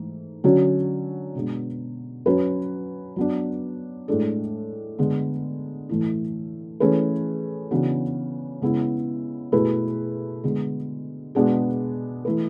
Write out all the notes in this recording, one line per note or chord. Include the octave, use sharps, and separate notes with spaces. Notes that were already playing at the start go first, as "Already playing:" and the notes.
Already playing: G#2 E3 A3
D3 F#3 C#4 F#4
B2 G#3 B3 D4
F#3 C#4 F#4 B4
F#3 B3 D4
A2 G#3 D4 A4
D3 G#3 B3
A2 E3 A3 E4
E3 A3 C#4 G#4 B4
C#3 E3 B3 D4 F#4
C#3 G#3 B3 E4
B2 A3 E4 G#4 B4
D3 G#3 B3
B2 G#3 B3 D4 G#4
E3 A3 E4 B4